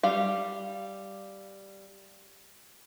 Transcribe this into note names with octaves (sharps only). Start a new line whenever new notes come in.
G3 F5